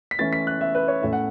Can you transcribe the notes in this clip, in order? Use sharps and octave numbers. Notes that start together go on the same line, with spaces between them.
B6
E3 A3 C#4 E4 A6
B6
F#6
E5
B4
C#5
A2 A3 C#4 E4 E5
F#5